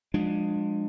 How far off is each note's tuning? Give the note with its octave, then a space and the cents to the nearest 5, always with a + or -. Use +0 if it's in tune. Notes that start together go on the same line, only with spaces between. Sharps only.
F3 +35 G#3 +0 D4 +25